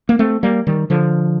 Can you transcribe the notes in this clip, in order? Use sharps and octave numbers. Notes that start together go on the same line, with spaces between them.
A#3
A3 C4
G3 A#3
D#3 G3
D3 F3